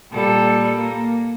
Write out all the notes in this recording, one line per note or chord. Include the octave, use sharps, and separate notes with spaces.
A#2 G3 A4
A#3